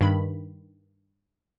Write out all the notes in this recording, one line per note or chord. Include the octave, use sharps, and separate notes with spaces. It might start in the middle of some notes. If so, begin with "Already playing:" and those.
G2 D#3 B5